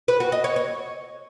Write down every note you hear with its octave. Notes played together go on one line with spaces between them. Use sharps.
B4
F#4
D#5
C#5
C#5